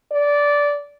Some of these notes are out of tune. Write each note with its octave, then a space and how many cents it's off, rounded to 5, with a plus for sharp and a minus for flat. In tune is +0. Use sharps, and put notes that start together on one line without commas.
D5 -15